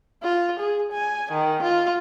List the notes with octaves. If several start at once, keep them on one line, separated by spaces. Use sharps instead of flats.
F4
G#4
G#5
D#3
F4